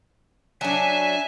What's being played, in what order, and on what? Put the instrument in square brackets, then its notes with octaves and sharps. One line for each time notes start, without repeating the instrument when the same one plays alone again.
[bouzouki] F#3 D4 [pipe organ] E5 G#5 A5